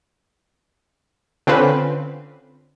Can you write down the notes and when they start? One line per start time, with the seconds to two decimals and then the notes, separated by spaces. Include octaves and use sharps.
1.47 D3 C4 C#4 F4 B4